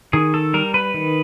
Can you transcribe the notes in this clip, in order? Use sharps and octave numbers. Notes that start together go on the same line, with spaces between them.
D#3 G#4
A4
G3 A#4
B4
D#3